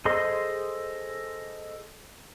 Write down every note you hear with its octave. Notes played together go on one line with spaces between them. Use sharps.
G#4 A4 C5 D#5 C6